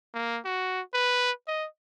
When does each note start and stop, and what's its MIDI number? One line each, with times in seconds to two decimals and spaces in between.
0.14 0.39 58
0.45 0.81 66
0.94 1.31 71
1.48 1.67 75